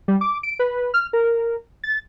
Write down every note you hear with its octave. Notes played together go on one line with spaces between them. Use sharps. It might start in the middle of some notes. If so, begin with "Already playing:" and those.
G3
D6
D7
B4
F6
A#4
A6